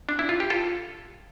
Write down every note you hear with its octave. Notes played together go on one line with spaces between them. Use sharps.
D4
E4
F4
G4
F4 A4